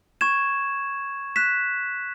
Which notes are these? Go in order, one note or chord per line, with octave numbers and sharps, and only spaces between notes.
C#6 G#6 E7
F#6 B6 E7